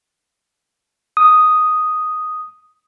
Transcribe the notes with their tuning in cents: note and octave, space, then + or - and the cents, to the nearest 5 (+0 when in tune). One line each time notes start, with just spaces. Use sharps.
D#6 +0